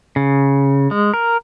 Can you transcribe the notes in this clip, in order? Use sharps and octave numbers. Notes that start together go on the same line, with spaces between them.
C#3
G#3
A#4